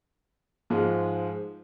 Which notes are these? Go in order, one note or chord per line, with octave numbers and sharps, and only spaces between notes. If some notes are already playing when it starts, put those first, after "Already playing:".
G#2 F3 G#3